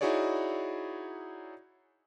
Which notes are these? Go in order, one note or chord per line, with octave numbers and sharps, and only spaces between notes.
D#4 E4 F#4 G#4 C#5 D5